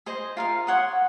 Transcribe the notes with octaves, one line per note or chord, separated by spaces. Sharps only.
G#4 C5 D#5
F4 A#4 F5
C#5 F#5 C6 D#6